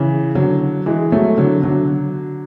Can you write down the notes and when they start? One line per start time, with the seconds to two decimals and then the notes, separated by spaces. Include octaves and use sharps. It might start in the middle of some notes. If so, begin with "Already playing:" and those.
Already playing: C#3 E3
0.35 D3 F#3
0.86 E3 G#3
1.12 F#3 A3
1.38 D3 F#3
1.63 D3 F#3